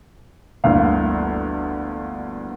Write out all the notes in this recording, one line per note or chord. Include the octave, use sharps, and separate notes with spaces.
G1 D2 E3 A#3 F5